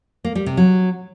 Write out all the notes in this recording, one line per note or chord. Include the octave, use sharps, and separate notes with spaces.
A#3
G3
C3
F#3